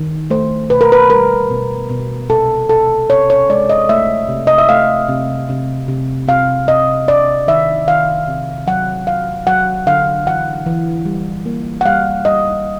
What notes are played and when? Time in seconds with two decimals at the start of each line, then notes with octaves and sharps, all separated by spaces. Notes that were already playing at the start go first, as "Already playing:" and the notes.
Already playing: D#3
0.30 A3 C5
0.70 B2 B4
0.81 A#4
0.92 B4
1.10 G3 A#4
1.50 B2
1.90 B2
2.30 C3 A4
2.69 C3 A4
3.10 C3 C#5
3.30 C#5
3.50 G#3 D5
3.70 D#5
3.89 A3 E5
4.29 C3
4.47 D#5
4.58 E5
4.69 A3 F5
5.09 C3
5.49 C3
5.88 C3
6.28 C3 F5
6.68 C3 D#5
7.07 C3 D5
7.47 D#3 E5
7.87 D#3 F5
8.27 C3
8.67 F#3 F#5
9.07 F#3 F5
9.47 F#3 F#5
9.87 D3 F5
10.26 E3 F#5
10.66 E3
11.05 G3
11.46 A#3
11.81 F#5
11.86 G3 F5
12.25 G3 D#5